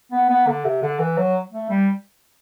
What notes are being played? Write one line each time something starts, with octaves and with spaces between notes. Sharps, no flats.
B3
B3
D3
C3
D3
E3
F#3
A3
G3